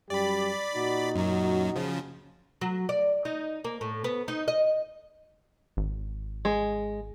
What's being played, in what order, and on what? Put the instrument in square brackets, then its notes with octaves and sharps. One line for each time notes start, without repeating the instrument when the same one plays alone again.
[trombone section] F#2 G3 G4 [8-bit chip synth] D5 B5
[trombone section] A#2 D#4 F#4
[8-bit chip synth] F#2 F#3
C#3 F3
[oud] F#3
D5
D#4
A#3
A2
B3
D#4
D#5
[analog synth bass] G#1
[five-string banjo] G#3